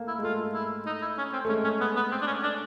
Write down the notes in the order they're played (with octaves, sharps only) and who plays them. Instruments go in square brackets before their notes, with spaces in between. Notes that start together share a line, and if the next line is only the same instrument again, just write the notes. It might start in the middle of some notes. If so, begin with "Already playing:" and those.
Already playing: [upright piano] A3 A#3
[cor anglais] E4
[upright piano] G#3
[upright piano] A3 [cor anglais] F4
[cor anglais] E4
D#4
E4
C#4
C4
[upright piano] A3
[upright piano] G#3 [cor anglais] C#4
[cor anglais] C#4
B3
B3
C4
D4
C#4
D4